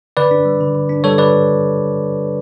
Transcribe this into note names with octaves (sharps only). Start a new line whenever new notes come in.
D3 B4 D5
D4
G3
D3
D3
D4
G3 A4 C#5
D3 B4 D5